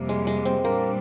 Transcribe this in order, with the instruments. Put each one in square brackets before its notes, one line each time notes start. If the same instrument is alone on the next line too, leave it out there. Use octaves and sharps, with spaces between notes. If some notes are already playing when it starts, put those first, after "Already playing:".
Already playing: [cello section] F2 C3 G3 A#3
[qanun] G#3
G#3
C4
[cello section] A#2 G3 D4 [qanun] A#3